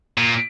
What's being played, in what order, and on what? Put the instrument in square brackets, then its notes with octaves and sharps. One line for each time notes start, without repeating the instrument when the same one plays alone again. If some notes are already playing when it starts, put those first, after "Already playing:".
[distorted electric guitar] A#2